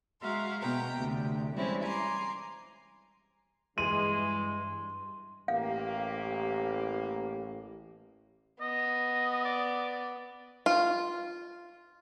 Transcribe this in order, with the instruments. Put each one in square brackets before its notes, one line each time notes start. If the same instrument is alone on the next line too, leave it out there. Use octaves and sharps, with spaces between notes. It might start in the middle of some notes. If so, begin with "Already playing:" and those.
[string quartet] G#3 F#4 E5 F5 A#5 C6
B2 B3 G5 A#5
D2 C3
E3 G3 G#3 C4 C#4 E4
G#5 A#5 C6 D6
[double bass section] G2 [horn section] E3 G#3 [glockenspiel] C6 [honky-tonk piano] D#7
[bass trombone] A1 [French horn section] A#3 G4 [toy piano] F5
[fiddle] B3 [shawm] D#5
[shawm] D5
[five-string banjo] F4